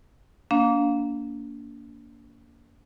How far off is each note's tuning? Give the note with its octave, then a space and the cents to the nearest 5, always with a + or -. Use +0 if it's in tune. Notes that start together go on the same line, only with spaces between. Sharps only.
A#3 +0 D4 -35 F5 +20